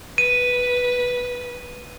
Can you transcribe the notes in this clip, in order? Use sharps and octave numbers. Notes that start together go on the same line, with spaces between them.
B4 D#7